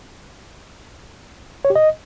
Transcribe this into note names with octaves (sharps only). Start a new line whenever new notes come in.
C#5
G4
D#5